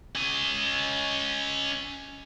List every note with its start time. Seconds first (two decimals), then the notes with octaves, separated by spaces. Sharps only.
0.16 C#4 D#5